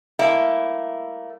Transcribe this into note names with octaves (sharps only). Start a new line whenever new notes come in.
G3 A3 A#3 E4 E5